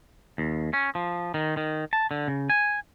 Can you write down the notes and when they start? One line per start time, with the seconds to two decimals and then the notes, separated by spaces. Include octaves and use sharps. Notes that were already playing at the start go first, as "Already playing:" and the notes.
0.38 D#2
0.73 C#4
0.95 F3
1.34 D#3
1.57 D#3
1.93 A5
2.11 D3
2.28 C#3
2.50 G#5